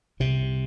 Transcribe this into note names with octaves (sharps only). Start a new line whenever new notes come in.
C2 C3